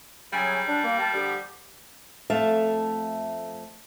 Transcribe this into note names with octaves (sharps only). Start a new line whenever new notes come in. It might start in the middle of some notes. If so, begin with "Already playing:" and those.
C#3 F#3 G3 G#5
D4
A#3
G4 A#4 A5
D3 F3 G4
F2 A3 E5 F5 A5